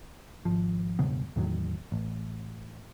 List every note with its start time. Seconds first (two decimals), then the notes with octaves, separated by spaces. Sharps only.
0.45 G#1 F3
0.99 E1 G2 C#3 B3
1.36 E2 A2 D#3 F#3
1.92 A1